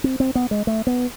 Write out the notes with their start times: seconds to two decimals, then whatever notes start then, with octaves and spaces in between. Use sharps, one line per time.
0.04 C4
0.20 C4
0.35 B3
0.51 G#3
0.67 A3
0.87 B3